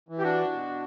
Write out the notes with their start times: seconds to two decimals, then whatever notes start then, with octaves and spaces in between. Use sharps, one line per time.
0.09 E3
0.18 G4
0.23 D4 F#4
0.53 B2